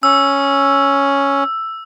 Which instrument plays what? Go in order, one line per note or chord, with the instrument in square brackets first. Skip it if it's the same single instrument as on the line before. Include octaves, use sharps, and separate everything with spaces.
[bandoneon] C#4 [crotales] E6